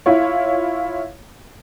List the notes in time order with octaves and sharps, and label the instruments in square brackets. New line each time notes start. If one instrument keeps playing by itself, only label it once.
[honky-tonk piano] E4 F4 C#5